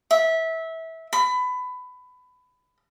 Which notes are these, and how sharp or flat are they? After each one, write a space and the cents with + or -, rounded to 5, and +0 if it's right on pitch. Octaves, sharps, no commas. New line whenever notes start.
E5 -20
B5 +20